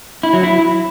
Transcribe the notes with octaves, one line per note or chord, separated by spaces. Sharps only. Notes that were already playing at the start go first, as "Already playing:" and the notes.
E4
F#3
E4